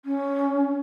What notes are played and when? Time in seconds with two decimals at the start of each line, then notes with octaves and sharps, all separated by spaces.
0.05 C#4